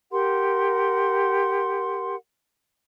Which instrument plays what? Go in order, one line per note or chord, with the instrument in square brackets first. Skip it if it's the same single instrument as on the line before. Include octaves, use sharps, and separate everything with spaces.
[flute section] G4 A#4 F#5 C6